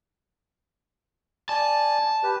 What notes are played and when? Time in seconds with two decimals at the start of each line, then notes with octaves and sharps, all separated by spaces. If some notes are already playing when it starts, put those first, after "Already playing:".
1.49 D5 G#5 A5
2.23 G4 B4